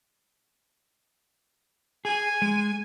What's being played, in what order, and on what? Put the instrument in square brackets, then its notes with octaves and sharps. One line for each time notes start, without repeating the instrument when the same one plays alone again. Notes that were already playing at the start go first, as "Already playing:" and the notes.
[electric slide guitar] G#4 [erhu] G#5
[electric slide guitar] G#3